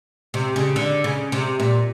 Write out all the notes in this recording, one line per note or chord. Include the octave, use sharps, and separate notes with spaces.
C3
C#3
D3
C#3
C3
A#2